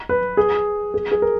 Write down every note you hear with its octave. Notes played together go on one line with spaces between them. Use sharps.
B4
G#4
G#4
G#4
A#4